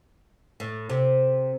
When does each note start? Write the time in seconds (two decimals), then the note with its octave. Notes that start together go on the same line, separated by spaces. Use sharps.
0.60 A2
0.90 C3